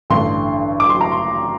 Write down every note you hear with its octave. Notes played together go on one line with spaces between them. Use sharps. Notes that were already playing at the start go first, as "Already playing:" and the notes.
A1 G2 D3 C6
D6
C6
A#5
C6